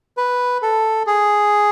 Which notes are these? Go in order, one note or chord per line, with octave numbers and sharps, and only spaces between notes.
B4
A4
G#4